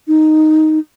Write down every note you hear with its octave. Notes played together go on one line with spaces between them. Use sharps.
D#4